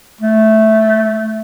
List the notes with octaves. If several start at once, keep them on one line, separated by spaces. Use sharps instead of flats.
A3